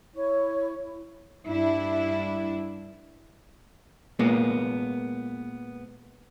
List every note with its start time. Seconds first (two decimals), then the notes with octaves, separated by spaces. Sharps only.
0.14 E4 C#5 C#6
0.80 E4
1.47 G2 D4 E4
4.19 A#2 G#3 A#3 B3